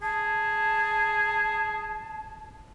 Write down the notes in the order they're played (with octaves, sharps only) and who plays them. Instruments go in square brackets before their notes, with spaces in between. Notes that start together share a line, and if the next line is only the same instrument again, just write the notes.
[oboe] G#4 [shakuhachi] A5